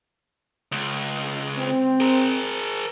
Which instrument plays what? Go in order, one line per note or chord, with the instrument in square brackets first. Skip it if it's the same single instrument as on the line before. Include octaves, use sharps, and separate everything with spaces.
[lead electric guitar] C#2
[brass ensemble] C4
[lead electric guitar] G#4 A#4